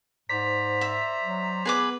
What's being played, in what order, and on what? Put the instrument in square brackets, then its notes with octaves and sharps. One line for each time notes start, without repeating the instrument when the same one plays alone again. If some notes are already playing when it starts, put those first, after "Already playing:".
[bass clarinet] G#2 [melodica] C5 D5 A#5 [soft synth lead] B6
[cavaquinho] E5
[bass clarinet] F#3
[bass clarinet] B3 [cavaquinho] G#4 B4 D6